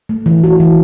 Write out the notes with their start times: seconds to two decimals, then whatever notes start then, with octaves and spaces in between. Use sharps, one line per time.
0.09 A3
0.26 E3
0.44 F#4
0.60 E3